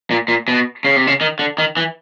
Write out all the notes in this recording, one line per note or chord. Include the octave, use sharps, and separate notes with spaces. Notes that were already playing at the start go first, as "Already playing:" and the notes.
A#2
A#2
B2
C#3
C3
C#3
D#3
D3
D#3
E3